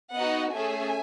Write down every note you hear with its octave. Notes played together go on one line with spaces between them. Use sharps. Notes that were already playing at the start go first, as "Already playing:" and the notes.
B3 D#4 F#4 D#5 F#5
A3 C#4 G#4 E5 G#5